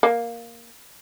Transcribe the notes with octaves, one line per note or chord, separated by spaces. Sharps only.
A#3